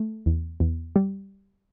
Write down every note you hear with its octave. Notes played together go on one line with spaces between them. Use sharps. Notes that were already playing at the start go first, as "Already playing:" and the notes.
Already playing: A3
E2
E2
G3